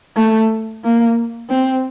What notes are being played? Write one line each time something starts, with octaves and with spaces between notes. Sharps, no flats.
A3
A#3
C4